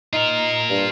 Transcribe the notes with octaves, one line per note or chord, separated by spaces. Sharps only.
D#4 F4 A#4
G2